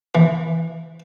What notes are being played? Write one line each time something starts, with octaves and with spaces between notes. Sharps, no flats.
E3